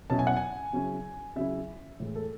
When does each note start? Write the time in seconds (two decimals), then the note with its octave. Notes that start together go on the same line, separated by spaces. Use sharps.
0.10 B2 F#3 C#4 E4 A5
0.19 G#5
0.27 F#5
0.37 G#5
0.73 C#3 F#3 C#4 E4
1.36 C#3 F#3 C#4 E4 E5
2.00 A2 E3 G#3
2.15 A4